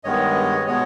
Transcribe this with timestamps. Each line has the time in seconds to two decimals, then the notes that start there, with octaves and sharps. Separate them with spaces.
0.04 G2 D#3 G#3 B3 C#5 D#5
0.67 B2 G#3 B3 C#5 D#5